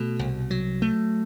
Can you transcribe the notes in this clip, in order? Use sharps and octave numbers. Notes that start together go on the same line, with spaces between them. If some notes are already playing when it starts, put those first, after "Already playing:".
Already playing: B2 A3
C2
F#3
A3